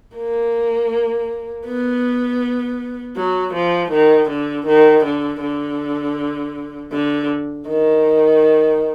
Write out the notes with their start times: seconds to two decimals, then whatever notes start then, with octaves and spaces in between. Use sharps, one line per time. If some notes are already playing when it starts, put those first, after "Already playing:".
0.16 A#3
1.67 B3
3.17 F#3
3.54 F3
3.92 D#3
4.30 D3
4.67 D#3
5.05 D3
5.42 D3
6.92 D3
7.68 D#3